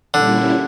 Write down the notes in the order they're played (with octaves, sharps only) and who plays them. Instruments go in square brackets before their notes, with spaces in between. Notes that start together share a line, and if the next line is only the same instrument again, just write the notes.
[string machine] A#2 G3 C#4 E4 [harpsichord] D3